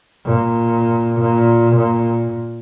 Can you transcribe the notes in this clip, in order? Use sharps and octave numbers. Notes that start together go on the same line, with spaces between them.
A#2
A#2
A#2